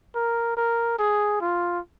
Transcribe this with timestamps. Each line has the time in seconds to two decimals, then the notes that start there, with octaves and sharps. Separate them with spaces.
0.15 A#4
0.57 A#4
0.99 G#4
1.41 F4